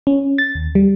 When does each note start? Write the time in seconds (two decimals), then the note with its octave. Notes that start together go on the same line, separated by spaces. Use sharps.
0.07 C#4
0.38 A6
0.55 D#2
0.75 G3